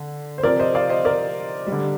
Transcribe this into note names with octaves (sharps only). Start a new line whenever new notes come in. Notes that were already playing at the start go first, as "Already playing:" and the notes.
Already playing: D3
C5
C3 F3 A#4 D5
C5 D#5
D5 F5
C5 D#5
A#4 D5
G3
D3